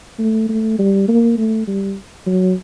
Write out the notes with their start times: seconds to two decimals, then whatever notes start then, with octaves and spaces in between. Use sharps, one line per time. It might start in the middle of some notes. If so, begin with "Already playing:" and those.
0.19 A3
0.49 A3
0.79 G3
1.08 A#3
1.38 A3
1.67 G3
2.27 F#3